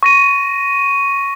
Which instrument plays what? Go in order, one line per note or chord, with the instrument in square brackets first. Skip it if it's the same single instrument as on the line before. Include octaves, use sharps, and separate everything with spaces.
[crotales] C#6 A#6 D#7